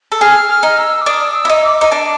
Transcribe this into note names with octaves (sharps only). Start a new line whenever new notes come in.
A4
G#4 F6
F6
D#4
E6
D6
D4 D#6
E6
E4
D#4
D6
D#4
D4